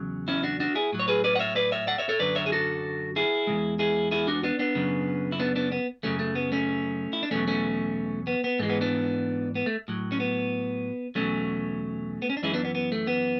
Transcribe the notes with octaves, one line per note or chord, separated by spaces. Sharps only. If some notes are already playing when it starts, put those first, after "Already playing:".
Already playing: E2 C#3 F#3
C#4 E4
D4 F#4
D4 F#4
E4 G#4
A2 F#3
C#5
G#4 B4
B4 D5
F#5
C#5 E5
B4 D5
C#5 E5
D5 F#5
C#5 E5
A4 C#5
F#2 D3 F#3 B4 D5
C#5 E5
G#4
F#4 A4
E4 G#4
E2 C#3 G#3
E4 G#4
E4 G#4
D4 F#4
B3 D4
B3 D4
F#2 C#3 F#3
E4
B3 D4
B3 D4
B3
F#2 C#3 F#3 A3 C#4
A3
B3
A3 C#4
E4
D4
E2 B2 F#3 A3 C#4
A3 C#4
B3
B3
G#2 E3 G#3 A3
B3
B3 D4
B3
A3
A2 F#3
C#4
B3
E2 B2 F#3 A3 C#4
B3
C#4
D4
F#2 E3 G#3 C#4 E4
B3 D4
B3
B3
A3
B3